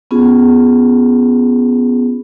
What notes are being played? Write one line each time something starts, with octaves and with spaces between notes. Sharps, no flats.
B3 C#4 F4 G#4